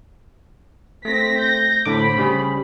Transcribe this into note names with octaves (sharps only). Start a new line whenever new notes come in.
A3 C4 A#6 B6
G6 A#6
A2 D3 C5 B5 D6
C#3 G3 G#4